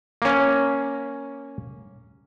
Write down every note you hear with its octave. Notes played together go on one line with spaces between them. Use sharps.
A#3 C#4